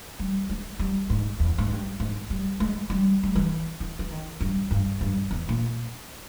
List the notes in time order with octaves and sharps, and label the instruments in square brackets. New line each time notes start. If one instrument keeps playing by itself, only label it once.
[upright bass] G3
G#3
G3
G#2
E2
G#2
G2
G#2
G3
G#3
G3
G3
E3
E3
E3
D#3
G2
G2
G2
E2
A#2